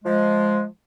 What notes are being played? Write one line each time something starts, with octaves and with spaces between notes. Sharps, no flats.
F3 G#3